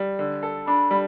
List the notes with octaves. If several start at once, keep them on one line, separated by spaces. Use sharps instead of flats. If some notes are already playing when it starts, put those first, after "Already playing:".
Already playing: G3
D3
A4
D4 B5
G3